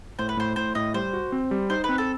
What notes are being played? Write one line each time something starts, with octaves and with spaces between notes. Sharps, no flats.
A2 C5
B4
A2 C5
A2 C5
A2 D#5
G3 C5
F#4
C4
G3
D#4 C5
B4
C4
A4